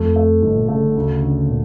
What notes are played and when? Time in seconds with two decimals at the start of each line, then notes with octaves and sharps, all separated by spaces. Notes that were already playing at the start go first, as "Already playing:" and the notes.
Already playing: F2 A3
0.16 A3
0.42 G1 G2
0.55 A#2
0.68 C#3 A3
0.82 D3
0.96 D2 C#3
1.23 D3
1.49 A#2